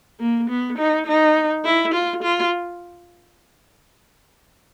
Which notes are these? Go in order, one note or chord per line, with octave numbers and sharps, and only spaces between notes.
A#3
B3
D#4
D#4
E4
F4
F4